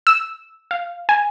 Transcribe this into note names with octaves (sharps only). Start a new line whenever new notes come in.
E6
F5
G#5